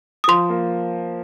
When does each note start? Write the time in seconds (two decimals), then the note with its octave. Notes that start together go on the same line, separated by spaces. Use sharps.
0.24 D#6
0.28 F3 C6
0.49 A#3